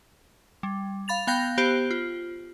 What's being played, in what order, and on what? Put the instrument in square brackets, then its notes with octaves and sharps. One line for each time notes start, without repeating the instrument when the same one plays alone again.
[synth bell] G3
F5 B5 A6 F7
B3 F5 G5 G6 A#6
B3 G4 C5
F4